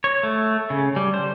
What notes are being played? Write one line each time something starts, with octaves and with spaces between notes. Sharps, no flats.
C#5
A3
C#3
G3
C5